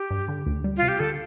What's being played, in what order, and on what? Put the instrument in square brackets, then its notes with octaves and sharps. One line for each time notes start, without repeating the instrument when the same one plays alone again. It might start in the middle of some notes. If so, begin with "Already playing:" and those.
Already playing: [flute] G4
[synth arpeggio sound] G2
D3
D2
G3
[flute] F4
[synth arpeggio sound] C3
[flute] G4
[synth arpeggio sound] D3 [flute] A4